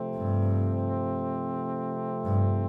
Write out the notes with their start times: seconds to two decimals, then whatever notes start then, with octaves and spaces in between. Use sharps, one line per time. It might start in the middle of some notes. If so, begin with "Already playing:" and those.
Already playing: C3 F3 A3 C4
0.17 G2
2.25 G2